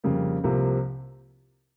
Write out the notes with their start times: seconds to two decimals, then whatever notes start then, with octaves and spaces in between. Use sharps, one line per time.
0.04 F2 C#3 G3 A#3
0.44 C2 C3 F3 A#3